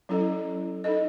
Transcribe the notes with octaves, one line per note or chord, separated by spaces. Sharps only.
F#3 C#4 E4 A4 D#5
D#4 A4 D#5